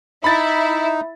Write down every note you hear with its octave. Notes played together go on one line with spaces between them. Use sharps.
D#4 E4 B5 A6